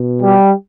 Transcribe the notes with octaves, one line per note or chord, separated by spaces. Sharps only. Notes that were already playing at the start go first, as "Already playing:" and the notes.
Already playing: B2
G3 G4